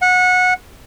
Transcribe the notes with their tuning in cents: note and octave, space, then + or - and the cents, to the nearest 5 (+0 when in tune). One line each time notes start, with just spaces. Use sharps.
F#5 -20